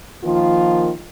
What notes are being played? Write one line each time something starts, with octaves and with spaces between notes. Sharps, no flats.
D#3 F3 A#3 F4